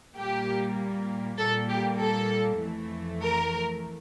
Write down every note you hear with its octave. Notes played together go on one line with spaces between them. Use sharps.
A#2 G3 A#3 G4
A#2 G3 A#3 A4
G4
A4
F2 E3 A3
A#4